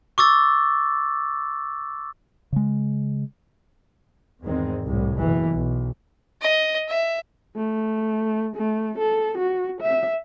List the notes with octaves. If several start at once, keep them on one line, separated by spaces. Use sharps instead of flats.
C#6 D6 E6 A6
C#3 G#3
E2 G#2 D#3 G#3 C4
C2 A2
F#1 B2 E3
B1
D#5
E5
A3
A3
A4
F#4
E5